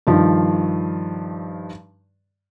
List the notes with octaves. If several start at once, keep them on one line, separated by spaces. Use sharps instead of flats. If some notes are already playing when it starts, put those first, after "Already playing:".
G2 D#3 F3